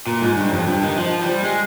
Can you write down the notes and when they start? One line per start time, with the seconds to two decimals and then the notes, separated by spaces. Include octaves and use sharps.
0.07 A#2
0.22 G#2
0.37 G2
0.53 F2
0.68 G2
0.83 D#3
0.98 F3
1.21 G3
1.44 G#3